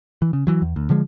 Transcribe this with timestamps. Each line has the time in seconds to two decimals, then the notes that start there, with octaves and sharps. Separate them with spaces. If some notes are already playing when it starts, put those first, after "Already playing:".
0.22 E3
0.33 C#3
0.47 E3 F#3
0.62 E2
0.76 D2
0.90 D3 F3 G#3